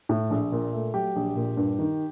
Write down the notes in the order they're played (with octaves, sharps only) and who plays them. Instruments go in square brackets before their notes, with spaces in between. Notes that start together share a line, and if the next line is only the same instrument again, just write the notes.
[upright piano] A2
A#1
A#2
A3
F#3 G4
A#1
A#2
G2
D#3